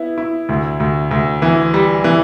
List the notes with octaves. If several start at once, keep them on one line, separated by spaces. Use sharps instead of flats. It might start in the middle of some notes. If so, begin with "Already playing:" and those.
Already playing: B3 E4
E4
D2
D2
D2
E3
G3
E3